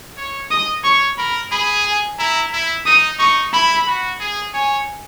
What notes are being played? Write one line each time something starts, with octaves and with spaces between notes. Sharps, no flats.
C#5
D#5 D#6
C#5 C#6
A#4 B5
G#4 B5
G#5
E4 A#5
E4
D#4 D#6
D#4 C#6
E4 B5
F#4
G#4
C#5 G#5